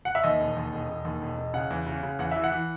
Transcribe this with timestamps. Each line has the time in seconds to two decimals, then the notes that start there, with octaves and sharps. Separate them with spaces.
0.05 F#5
0.15 E5
0.24 D#2 D#5
0.40 E1
0.56 D#2
0.73 E1
0.88 E1
1.05 D#2
1.22 E1
1.38 E1
1.54 C#3 F#5
1.70 E2
1.86 C#3
2.03 C#3
2.19 E2 F#5
2.31 E3 E5
2.44 F#5
2.52 E3